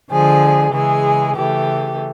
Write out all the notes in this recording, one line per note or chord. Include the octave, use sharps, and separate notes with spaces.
D3 F3 G#3 G#4
C#3 E3 G#3 G#4
C#3 E3 A3 G4